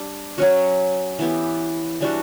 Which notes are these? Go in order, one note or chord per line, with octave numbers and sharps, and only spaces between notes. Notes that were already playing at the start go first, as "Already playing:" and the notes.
Already playing: G3 D4
F#3 C#4 F#4
E3 B3 E4 G4
E3 G3 D4 F#4